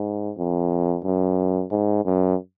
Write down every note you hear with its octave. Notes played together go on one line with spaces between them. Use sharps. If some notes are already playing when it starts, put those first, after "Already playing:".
Already playing: G#2
F2
F#2
G#2
F#2